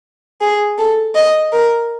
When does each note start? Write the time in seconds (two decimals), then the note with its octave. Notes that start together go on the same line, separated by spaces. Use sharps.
0.41 G#4
0.78 A4
1.16 D#5
1.52 A#4